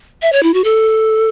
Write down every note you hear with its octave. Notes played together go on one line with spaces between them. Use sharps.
E5
C#5
E4
F#4
A4